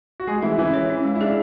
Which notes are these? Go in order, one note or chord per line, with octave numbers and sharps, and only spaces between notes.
F#4
G#3 A3 G#4
E3 E4 A4
E3 C#4 E4
C#5
C#4
G#3
E4
D4 G#4